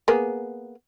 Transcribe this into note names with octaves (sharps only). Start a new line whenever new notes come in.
A#3 B3 G#4